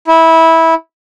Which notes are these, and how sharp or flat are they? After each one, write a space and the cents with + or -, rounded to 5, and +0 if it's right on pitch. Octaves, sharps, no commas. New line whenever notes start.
E4 -15